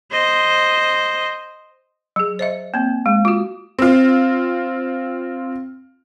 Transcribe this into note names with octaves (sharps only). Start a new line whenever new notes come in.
C5 D#5
F#3 G#4
C5 D#5 E5
A#3 C4
G#3
F4 F#4
C4 F4